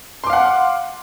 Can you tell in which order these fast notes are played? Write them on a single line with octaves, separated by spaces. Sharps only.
C6 D6 F5 F#5